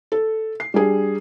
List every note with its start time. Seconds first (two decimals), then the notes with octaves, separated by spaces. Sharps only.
0.12 A4
0.60 C7
0.74 G3 D4 G#4